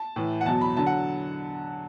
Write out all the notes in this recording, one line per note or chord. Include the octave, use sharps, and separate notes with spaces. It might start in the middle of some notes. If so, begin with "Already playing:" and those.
Already playing: A5
A2 E3
F#5
E2 B2 F#3 A5
B5
D3 F#3 A5
F#5